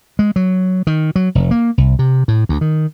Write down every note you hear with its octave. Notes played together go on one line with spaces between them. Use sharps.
G#3
F#3
D#3
F#3
F1
A#3
C2
C3
A2
D2
D#3